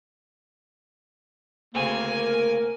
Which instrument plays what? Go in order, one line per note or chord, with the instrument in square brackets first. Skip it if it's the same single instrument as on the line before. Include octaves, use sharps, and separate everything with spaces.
[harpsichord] D2 C#3 C4 [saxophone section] A#3 [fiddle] G#5